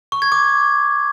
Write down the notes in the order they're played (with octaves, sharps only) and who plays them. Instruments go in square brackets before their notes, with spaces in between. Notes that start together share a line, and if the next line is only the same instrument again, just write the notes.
[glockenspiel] C#6
G#6
D6